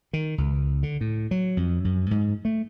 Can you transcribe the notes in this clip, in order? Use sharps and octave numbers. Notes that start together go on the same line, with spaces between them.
D#3
C#2
D3
A2
F#3
F2
F#2
G#2
A3